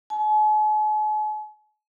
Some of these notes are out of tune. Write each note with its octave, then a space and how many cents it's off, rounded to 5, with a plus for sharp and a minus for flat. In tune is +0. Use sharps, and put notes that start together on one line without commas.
G#5 +45